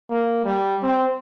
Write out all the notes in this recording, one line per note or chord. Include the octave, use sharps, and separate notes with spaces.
A#3
G3
C4